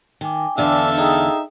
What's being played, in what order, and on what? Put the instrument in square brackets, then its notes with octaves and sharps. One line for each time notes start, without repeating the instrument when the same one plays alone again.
[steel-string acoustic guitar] D#3 [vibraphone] G5 G#5 D6
[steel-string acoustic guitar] E2 D3 [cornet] D4 [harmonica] A4 E5 F5
[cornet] D#4 [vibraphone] G#4 G5 D#6